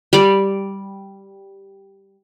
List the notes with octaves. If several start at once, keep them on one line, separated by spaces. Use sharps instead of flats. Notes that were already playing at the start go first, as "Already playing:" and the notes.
G3 D5